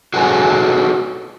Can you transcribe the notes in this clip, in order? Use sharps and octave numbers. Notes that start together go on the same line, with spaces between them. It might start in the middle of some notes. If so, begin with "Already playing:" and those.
F#4 G#4 A4 B4 C#5 G#5